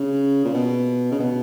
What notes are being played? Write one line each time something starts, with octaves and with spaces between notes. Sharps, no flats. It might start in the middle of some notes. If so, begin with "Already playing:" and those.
Already playing: C#3
A#2
B2
C#3
B2